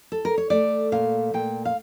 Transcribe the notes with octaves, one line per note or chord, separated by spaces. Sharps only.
A4
A#4
C#5
A3 D5
A#2 F5
A#2 G5
F5